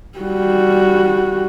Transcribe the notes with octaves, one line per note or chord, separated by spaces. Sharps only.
G3 F#4